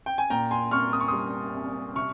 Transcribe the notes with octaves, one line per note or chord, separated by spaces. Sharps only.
G5
G#5
A#2 G5 A#5
G#5 C6
C2 C#6 F6
D#6
C#6
G3 C6 D#6
C2
C3 C#6 F6